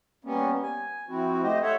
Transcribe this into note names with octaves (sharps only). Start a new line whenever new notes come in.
G3 A#3 B3 C#4
G#5
F3 C4 E4 F#4
A3 G4 C5 D#5
A4 C#5 E5 F#5